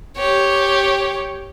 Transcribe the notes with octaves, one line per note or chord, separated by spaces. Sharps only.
G4 C#5